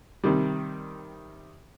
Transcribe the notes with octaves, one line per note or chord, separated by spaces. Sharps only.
C3 D#3 G3